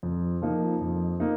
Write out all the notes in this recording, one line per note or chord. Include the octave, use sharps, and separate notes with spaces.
F2
F3 A#3 D#4
F2
A#3 D#4